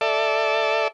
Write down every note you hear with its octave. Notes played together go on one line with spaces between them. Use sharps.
A4 D5 E5